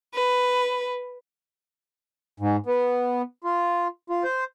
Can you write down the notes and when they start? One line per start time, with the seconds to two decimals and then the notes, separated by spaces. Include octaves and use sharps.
0.15 B4
2.40 G#2
2.66 B3
3.44 F4
4.10 F4
4.24 C5